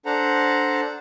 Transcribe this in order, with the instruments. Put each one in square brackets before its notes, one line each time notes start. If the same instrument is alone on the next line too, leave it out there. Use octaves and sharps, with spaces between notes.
[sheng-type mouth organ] D4 A4 C5 F#5 A#5